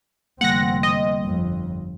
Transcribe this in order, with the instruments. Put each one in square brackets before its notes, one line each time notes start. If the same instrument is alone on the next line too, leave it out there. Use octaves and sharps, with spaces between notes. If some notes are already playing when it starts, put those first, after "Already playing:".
[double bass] F1 C4 [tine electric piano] D3 G3 A#3 [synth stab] F#5 A#6
[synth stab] D#5
[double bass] G1 F2